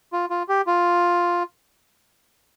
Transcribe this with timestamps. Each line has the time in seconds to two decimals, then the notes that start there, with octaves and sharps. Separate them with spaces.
0.13 F4
0.30 F4
0.49 G4
0.67 F4